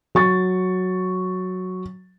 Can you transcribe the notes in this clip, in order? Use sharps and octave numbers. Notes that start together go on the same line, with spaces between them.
F#3 C#6 A6